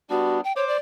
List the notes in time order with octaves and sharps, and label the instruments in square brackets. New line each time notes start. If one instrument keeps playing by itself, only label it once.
[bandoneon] G3 B3 D4 [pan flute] F#4
[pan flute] G5
[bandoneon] C5 D6 [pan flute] C#5
[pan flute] D5